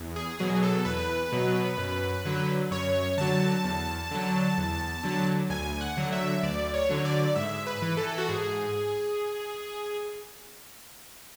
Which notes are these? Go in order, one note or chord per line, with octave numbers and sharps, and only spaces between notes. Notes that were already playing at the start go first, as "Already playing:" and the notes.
Already playing: E2
G#4
B2 F#3 G#4
A4
E2 B4
B2 F#3
F#2
D3 F#3
F#2 C#5
D3 F#3 A5
E2
D3 F#3
E2
D3 F#3
D2 G#5
F#5
D3 F#3
E5
D2 D5
C#5
D3 F#3
D5
G#2 E5
B4
E3
A4
F#4
G#2 G#4